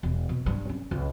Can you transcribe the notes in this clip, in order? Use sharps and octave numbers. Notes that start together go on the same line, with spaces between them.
E1
B2
G2
C#4
C#2